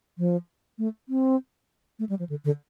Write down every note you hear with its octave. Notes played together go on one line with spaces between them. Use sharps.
F3
A3
C4
A3
G3
F3
D3
D3